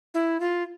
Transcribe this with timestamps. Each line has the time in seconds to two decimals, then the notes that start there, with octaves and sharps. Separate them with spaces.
0.14 E4
0.40 F4